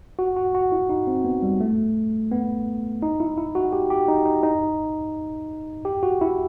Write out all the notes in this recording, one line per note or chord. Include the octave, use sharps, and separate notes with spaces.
F#4
F#4
F#4
E4
D#4
C4
B3
G3
A3
B3
D#4
E4
E4
F#4
G4
G4
D#4
D#4
D#4
G4
F#4
E4